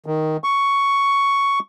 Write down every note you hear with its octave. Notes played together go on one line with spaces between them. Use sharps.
D#3
C#6